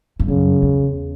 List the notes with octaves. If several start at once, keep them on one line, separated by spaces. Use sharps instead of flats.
G2
F#2 C#3
E2